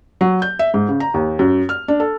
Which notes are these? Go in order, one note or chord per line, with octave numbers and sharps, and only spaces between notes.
F#3
G6
E5
G#2
C#3
A#5
D#2
F#2
F6
D4
A4